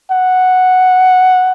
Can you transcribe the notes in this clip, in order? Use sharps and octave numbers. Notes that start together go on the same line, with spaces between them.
F#5